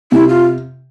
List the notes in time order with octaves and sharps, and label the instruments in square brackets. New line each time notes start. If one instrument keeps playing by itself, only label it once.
[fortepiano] C3 [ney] E4
[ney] F4